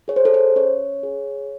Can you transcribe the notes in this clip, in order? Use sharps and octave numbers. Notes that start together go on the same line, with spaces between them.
G#4 C#5
C5
A4
C5
C#4 C#5
G#4